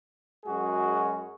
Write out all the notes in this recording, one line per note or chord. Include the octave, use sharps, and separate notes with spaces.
F#2 G#3 F#4 G#4